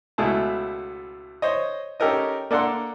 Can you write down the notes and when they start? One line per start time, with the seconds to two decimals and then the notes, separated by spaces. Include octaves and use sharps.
0.18 C#2 B2 A3 E4 G#4 A5
1.42 C5 C#5 D#5
2.00 C#4 D#4 G4 A4 A#4 D#5
2.51 A#3 D4 A4 F#5 C6